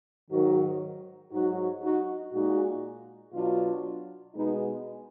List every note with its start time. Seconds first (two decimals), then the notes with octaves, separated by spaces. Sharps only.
0.30 G#2 D#3 F#3 F#4 A#4
1.32 G#2 F#3 D#4 F#4
1.81 D#4 F#4
2.32 A#2 G#3 D#4 F#4
3.33 B2 F#3 D4 F4
4.35 B2 G#3 B3 D#4